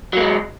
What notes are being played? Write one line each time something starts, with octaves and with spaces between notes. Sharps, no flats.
F#3 G#3 A#3